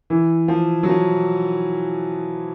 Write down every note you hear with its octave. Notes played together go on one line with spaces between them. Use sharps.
E3
F3
F#3
F3